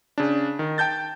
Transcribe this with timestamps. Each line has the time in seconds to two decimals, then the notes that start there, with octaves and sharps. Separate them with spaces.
0.18 C#3 D4
0.59 D#3
0.78 G5 A5 G6 A6